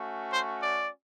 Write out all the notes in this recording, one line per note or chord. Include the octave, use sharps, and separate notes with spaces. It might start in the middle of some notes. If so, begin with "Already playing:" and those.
Already playing: A3 C#4 F#4
C5
D5